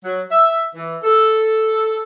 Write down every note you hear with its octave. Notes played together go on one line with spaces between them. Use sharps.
F#3
E5
E3
A4